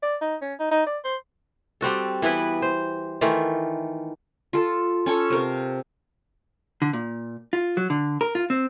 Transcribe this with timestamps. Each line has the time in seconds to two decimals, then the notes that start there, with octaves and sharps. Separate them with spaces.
0.03 D5
0.21 D#4
0.42 C#4
0.60 D#4
0.71 D#4
0.87 D5
1.05 C5
1.81 G3 C4 F#4 A4
2.22 E3 B3 E4 B4
2.62 C5
3.21 D#3 E3 A3 F4
4.53 F4 A4
5.06 C#4 A4 C#5
5.30 C3 A#4 F5
6.82 D3
6.93 A#2
7.53 F4
7.77 F#3
7.90 D3
8.21 A#4
8.35 F4
8.50 C4